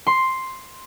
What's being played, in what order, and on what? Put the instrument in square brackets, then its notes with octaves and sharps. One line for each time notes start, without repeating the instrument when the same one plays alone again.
[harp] C6